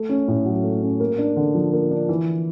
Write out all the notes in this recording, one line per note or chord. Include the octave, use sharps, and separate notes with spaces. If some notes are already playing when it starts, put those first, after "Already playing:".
Already playing: A3
C#4
A2
F#3
A3
C#4
A#3
D4
D3
F3
A#3
D4
E3